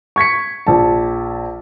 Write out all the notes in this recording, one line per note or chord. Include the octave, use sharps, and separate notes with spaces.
C#6 G#6 B6 C#7
A#1 A5